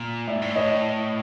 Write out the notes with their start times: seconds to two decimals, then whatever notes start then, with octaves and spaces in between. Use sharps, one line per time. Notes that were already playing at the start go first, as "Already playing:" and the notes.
Already playing: A#2
0.27 A2 D5 E5
0.35 G#2
0.42 A2
0.56 C#5 D#5